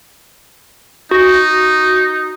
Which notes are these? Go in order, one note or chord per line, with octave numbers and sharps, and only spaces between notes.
D#4 F#4